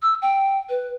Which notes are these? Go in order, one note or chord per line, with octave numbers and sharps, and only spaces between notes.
E6
G5
B4